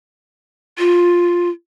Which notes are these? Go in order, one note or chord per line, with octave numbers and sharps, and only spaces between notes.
F4